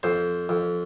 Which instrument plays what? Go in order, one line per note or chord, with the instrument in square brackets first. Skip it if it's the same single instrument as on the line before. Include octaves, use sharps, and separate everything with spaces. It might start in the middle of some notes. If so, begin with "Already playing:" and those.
[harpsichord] F2 C5
F2